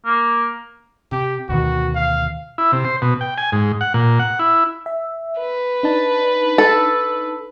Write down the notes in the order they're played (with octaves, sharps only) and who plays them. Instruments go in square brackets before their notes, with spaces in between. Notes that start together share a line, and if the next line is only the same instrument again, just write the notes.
[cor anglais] A#3
[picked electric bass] C3 [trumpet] G4
[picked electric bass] D2 B2 D#3 [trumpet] F#4
[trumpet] F5
[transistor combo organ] E4
C3
C5
B2
G5
G#5
G#2
F#5
A#2
F#5
E4
[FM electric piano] E5
[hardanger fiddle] B4
[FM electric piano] D4 D#4 A5
[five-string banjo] A4